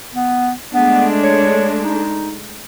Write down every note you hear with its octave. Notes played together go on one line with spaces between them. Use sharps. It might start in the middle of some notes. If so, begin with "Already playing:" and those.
B3
G#3 A3 B3 D4
C#5
D#4